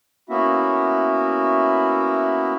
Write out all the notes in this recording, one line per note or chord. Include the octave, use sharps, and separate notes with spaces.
A#3 B3 C#4 E4 F#4 E5